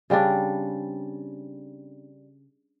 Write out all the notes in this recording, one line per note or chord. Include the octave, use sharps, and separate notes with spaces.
C#3 G3 C4 D4